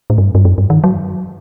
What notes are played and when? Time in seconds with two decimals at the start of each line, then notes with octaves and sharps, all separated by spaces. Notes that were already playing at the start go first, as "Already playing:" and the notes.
0.10 A2
0.18 G2
0.35 G2
0.45 F#2
0.58 G2
0.70 D#3
0.84 F#3